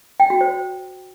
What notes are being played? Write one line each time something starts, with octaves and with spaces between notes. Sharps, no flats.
G5
F#4
C5